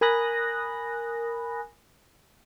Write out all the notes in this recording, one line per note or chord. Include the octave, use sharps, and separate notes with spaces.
A#4 G#5 B5 D#6 F#6 A#6